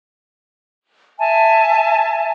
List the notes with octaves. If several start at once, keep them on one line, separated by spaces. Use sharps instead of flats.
E5 G#5 A5